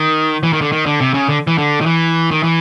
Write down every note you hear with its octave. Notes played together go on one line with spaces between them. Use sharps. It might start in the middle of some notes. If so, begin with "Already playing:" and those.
Already playing: D#3
E3
D#3
D3
D#3
D3
C3
C#3
D3
E3
D3
D#3
E3
D#3
E3